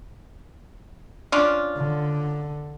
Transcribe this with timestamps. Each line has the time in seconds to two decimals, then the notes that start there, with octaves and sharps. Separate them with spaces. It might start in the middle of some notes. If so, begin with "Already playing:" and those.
1.32 C#4 D4 F4
1.77 D3